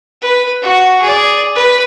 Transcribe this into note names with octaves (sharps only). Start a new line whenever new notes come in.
B4
F#4
G#4 D5
B4